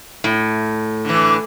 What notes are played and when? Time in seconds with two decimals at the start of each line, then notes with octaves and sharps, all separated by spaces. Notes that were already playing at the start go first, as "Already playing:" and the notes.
0.24 A2
1.05 D3 E3